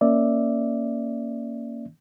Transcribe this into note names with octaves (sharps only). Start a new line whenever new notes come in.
A#3 C#4 D5 E5